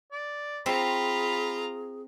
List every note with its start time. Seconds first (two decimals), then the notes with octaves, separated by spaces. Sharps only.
0.12 D5
0.66 C4 F4 G#4 E5 A#5 B5